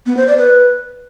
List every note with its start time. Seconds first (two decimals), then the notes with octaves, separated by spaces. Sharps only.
0.06 B3
0.17 C5
0.27 D5
0.38 B4